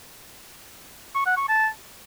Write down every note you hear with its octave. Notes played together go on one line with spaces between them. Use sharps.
C#6
F#5
C#6
A5